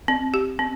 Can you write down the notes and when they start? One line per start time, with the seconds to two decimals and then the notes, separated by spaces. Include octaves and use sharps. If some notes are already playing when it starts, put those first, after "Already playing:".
0.08 C4
0.34 G4
0.59 C4